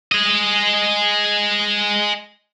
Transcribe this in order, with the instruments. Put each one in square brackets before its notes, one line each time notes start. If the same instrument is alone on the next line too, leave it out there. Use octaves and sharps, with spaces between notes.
[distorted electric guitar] G#4 D#5